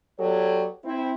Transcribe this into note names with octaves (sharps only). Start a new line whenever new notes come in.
F#3 B3 G4 A4 C#5 D5
C4 E4